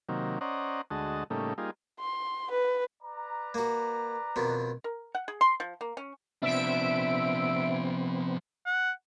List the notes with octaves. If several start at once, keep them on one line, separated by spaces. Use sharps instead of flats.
C3 D#3 F#3 A#3
C#4 C5 D5 D#5 F#5 A#5
D2 G#3 F#4 D#5 A5
A2 C#3 G3 A3 A#3 D#4
G3 A#3 D#4 F4 G#4
C6
B4
B4 D5 A#5
A#3 F#4
F2 B2 D#3
A#4
F#5
G#4
C6
F3
A#3
C#4
C3 F3 B3 C4 D4 E5 D7
F#5